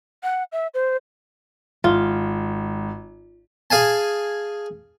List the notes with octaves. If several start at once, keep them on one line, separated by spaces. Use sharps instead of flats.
F#5
E5
C5
G#1 F4
G#4 F5 G#5 A5